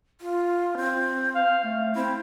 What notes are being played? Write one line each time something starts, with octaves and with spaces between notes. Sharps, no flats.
F4
C4
F5
A3
C4 E4